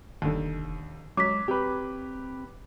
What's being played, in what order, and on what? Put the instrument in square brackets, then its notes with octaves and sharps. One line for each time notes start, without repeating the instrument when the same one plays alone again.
[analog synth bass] F1 [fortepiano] D#2 D3
[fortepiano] F#3 [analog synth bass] G#3 [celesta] D6 B6
[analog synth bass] C4 [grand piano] G4 B4